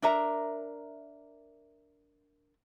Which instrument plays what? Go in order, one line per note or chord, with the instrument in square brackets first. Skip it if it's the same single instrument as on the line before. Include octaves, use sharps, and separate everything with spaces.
[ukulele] D4 A#4 E5 A#5